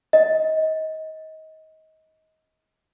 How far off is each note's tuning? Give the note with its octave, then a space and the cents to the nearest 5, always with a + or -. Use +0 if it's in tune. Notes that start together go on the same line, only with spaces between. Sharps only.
D#5 +25